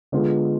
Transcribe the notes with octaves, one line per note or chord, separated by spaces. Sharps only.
D3 G#3 B3 F4